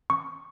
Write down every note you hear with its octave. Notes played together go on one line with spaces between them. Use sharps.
C#6